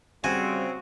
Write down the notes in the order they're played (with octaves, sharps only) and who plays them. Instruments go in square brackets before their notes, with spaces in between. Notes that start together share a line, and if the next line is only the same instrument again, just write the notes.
[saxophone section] C#3 C4 [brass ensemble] G3 [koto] F#4 [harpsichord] G#5